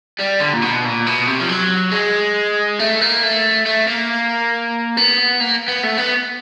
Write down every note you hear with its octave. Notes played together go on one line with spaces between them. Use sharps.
G3
D3
A#2
B2
A#2
B2
C3
F3
F#3
G#3
A3
A#3
A3
A3
A#3
B3
A#3
B3
A3
B3